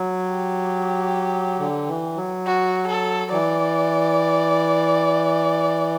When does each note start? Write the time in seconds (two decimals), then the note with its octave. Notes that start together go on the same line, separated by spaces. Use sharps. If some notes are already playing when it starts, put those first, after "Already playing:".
Already playing: F#3
0.29 G4
1.59 D3
1.88 E3
2.16 F#3
2.46 F#4
2.88 A4
3.32 E3 D5